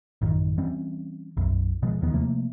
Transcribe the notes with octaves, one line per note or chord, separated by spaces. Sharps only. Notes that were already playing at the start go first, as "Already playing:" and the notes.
A1 F#2 D#3
E3 G3 C4 C#4
B1 F#2
B2 F3 G#3
E1 D#2 D#3 B3
C3 F3 A3 A#3